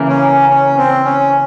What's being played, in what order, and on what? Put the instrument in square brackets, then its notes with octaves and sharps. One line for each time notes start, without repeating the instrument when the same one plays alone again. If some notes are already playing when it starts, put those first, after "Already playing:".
Already playing: [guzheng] C#3 E3 A#3
[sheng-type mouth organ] C#4
C#4
C4
C#4